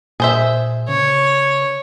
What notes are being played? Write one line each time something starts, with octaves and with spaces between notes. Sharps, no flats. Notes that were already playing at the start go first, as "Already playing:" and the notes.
A#2 G#4 C5 E5
C#3 C#5